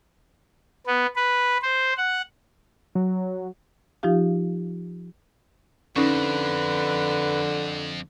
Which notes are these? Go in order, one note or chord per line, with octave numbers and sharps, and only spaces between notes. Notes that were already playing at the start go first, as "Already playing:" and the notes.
B3
B4
C5
F#5
F#3
F3 D#4 F4 G4 F5
F2 D3 C#4 D#4 B4